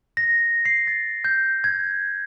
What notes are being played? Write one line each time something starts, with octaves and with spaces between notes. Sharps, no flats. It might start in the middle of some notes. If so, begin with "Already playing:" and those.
A#6
C7
A6
G6
G#6